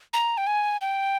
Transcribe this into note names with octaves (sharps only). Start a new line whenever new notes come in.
A#5
G5
G#5
G5